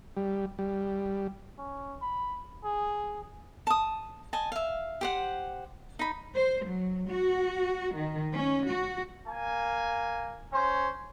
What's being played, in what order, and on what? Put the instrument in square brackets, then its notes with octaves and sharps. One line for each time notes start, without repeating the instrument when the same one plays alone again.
[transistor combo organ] G3
G3
[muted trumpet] C#4
B5
G#4
[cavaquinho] A5 D#6
D#5 G#5 A5
E5 F5
G4 C5 F#5
D#4 B5
[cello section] C5
F#3
F#4
D#3
C#4
F#4
[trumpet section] A#3 G#5
C#4 C5